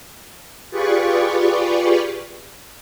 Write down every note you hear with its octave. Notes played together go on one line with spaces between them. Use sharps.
F4 G4 G#4 B4 D5 C#6